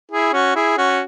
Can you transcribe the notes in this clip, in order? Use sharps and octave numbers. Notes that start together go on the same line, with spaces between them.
E4 G#4
C#4 F#4
E4 G#4
C#4 F#4